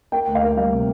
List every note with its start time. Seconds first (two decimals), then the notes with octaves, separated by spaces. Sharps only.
0.12 A#3 G5
0.27 D2
0.35 F5
0.43 A#3
0.57 G3 F5
0.73 C3